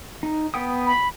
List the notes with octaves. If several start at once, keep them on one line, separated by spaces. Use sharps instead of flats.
D#4
B3 G5 D#6
B5